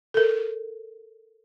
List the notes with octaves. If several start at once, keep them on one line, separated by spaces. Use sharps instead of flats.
A4 A#4